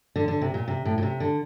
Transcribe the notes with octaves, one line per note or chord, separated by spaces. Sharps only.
D3
D3
C3
A#2
C3
A2
A#2
C3
D3